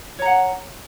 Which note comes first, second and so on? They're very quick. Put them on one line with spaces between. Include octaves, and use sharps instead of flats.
C#5 A#5 F#5